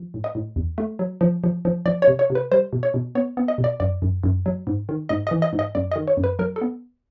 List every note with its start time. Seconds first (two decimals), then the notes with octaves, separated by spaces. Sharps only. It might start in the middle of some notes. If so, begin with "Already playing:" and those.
Already playing: F3
0.14 A2
0.24 D#5
0.35 A2
0.56 E2
0.78 A3
0.99 F#3
1.21 F3
1.44 F3
1.65 F3
1.86 F3 D5
2.02 C#5
2.07 C3
2.19 C#5
2.30 C3
2.35 B4
2.52 G3 C5
2.73 B2
2.83 C#5
2.94 B2
3.15 B3 C#5
3.37 B3
3.48 D#5
3.58 B2
3.64 D5
3.80 F#2 D5
4.02 F#2
4.24 F#2
4.46 F#3
4.67 G#2
4.89 D#3
5.09 G#2 D#5
5.27 D#5
5.31 E3
5.42 D#5
5.53 G#2
5.59 D#5
5.75 F#2 D5
5.91 D#5
5.96 D#3
6.08 C#5
6.17 F#2
6.24 B4
6.39 F#3 A#4
6.56 A4
6.61 B3